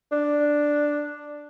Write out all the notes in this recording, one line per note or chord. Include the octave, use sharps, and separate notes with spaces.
D4